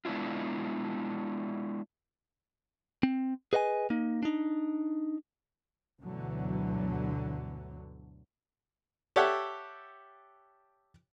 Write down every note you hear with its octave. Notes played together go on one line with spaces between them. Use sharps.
G#3 B3 D4 E4 F4
C4
G#4 B4 D#5 F5 G#5
A#3 D#4
D4 D#4
D2 G2 B2 D3 E3 F#3
G4 A4 C#5 D5 E5 F#5